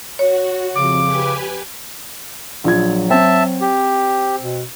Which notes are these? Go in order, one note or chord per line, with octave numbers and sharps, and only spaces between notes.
F#4 C#5
F2 C#3 D6
G4 B4 G#5
A#1 F#3 F4 G#6
C4 E5 A5
G4
B2